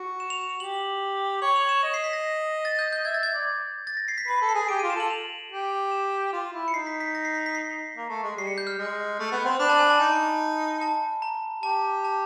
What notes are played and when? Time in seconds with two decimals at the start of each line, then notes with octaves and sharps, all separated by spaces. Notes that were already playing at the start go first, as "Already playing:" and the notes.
Already playing: F#4
0.20 E7
0.30 F7
0.41 F7
0.51 F7
0.60 G4 F#7
1.42 C#5 F#7
1.56 F7
1.69 E7
1.82 D#5 E7
1.94 C7
2.04 B6
2.13 A#6
2.65 A6
2.79 G6
2.93 G6
3.05 E5 G#6
3.14 A6
3.19 E5 G#6
3.33 D5
3.87 A6
3.97 A#6
4.08 C7
4.18 B6
4.28 B4 C7
4.42 A4
4.49 C7
4.55 G#4
4.69 G4 D7
4.79 D#7
4.83 F4
4.90 E7
4.96 A4 F#7
5.10 F7
5.51 G4
5.92 E7
6.33 F4
6.53 E4
6.68 C#7
6.74 D#4 C7
6.87 B6
7.00 B6
7.15 A#6
7.25 C7
7.35 B6
7.46 B6
7.55 C7
7.96 A#3
8.09 A3
8.23 G#3
8.37 G3 C7
8.47 C#7
8.58 G6
8.67 F6
8.78 G#3
9.19 A3
9.32 B3
9.45 C4
9.59 D4 B5
9.69 A5
9.79 G#5
9.90 A5
10.00 D#4 G#5
10.82 A5
11.22 A#5
11.63 G4 A5
12.04 A5